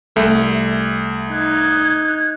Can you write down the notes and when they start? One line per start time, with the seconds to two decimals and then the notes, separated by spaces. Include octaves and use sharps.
0.16 C2 A3
1.30 D#4 F#6 G#6